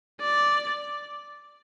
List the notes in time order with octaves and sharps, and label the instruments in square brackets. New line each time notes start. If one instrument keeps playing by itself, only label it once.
[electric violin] D5